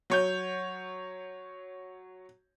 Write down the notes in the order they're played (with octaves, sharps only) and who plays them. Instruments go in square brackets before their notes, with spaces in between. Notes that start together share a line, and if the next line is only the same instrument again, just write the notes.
[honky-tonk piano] F#3 C#5 G6